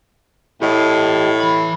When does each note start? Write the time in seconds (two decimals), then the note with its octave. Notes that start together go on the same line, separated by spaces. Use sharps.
0.62 A2 G4 D#5
1.40 E3 B5